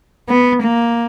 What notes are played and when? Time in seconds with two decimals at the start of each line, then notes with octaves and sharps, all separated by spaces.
0.28 B3
0.63 A#3